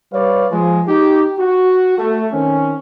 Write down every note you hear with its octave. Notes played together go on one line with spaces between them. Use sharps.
G3 B4 C#5 D5 F5
F3 G#3
D#4 G4
F#4
A3
D#3 C4 C#4